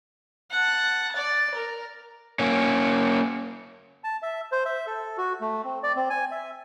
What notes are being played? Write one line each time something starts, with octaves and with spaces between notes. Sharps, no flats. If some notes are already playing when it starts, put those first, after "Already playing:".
F#5 A5
D5 A6
A#4
A#3 C#4
A5
E5
C5
E5
A4
F#4
A3
C4
D5
C4
G#5
E5